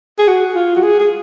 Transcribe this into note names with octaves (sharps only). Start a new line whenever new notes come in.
G#4
F#4
F4
F#4
G#4
G#4